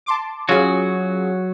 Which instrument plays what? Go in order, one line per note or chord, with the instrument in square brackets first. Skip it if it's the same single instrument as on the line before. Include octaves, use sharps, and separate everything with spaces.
[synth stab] A5 C6 D6
[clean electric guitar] F#3 F#4 [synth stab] C#4 F4 G#4